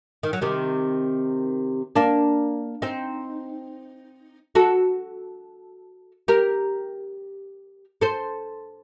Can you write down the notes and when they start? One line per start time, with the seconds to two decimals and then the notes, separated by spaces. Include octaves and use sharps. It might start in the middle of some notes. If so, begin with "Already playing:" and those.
0.23 D#3
0.33 F#3
0.41 C3 D#3
1.96 A#3 D4
2.82 C4 D#4
4.55 F#4 A4
6.28 G4 A#4
8.01 A4 C5